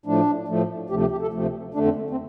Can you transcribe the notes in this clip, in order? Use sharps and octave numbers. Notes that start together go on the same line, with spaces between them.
A2 F3 A3 D4
A2 F3 A3
D2 C3 F3 A3 G4
G4
G4
A4
D2 C3 F3 A3
F2 D3 A3 D4
C4
A3
C4